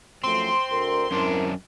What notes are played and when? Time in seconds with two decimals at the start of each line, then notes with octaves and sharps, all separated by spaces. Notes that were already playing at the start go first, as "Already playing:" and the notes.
0.24 F#2 F3 A3 C4 C6
0.70 D2 A#4
1.11 F#2 C4 D4 E4 A#4